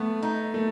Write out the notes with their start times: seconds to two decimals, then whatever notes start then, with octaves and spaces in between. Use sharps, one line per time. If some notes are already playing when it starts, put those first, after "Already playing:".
Already playing: A3 B3
0.23 D#4
0.54 A3